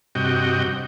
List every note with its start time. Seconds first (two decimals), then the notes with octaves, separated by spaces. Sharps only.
0.15 G2 C3 F#4 D#5 G5